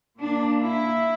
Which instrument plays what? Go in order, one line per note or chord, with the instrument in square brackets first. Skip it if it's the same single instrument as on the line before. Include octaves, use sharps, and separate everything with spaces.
[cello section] A#2 A#3 D4
E4